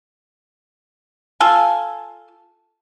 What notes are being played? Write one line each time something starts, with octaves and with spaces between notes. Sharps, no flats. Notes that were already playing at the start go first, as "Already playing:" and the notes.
F4 A4 F5 G#5